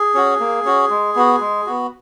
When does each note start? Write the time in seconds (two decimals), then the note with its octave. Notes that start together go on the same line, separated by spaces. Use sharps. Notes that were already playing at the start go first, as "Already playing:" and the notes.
Already playing: G#4
0.14 C#4 F#4
0.40 A#3
0.65 C#4 F#4
0.90 G#3
1.16 B3 F#4
1.41 G#3
1.66 B3 F#4